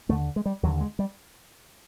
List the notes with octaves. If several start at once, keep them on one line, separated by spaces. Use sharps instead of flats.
D#2 D3 A3
G#3
G3
D#2 D3 F#3
G#3
G3